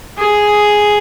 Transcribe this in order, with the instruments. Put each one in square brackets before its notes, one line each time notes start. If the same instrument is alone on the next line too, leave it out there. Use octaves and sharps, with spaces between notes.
[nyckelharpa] G#4